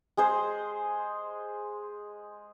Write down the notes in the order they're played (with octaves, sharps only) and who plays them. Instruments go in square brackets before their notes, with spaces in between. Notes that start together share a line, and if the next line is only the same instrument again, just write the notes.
[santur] G#3 G#4 C5